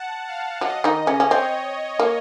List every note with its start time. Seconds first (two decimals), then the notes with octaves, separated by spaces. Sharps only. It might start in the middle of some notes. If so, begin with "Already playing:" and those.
Already playing: F#5 A5
0.27 F5
0.61 F#3 D#5
0.84 D#3 D#4
1.07 C#3 C#4
1.20 C#4
1.31 C4 C#5
1.99 A#3